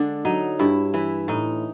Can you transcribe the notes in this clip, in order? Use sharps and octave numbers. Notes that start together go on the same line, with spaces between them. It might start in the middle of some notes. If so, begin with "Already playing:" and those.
Already playing: D3 G#3 D4
F#3 D#4
G2 E4
E3 E4
A2 D#4